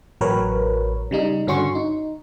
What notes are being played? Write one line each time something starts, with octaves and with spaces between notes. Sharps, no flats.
A1 F#3 A#4 B4 C#5
C#3 G3 D#4
G2 D3 C#4 F#4 C6 C#6
D#4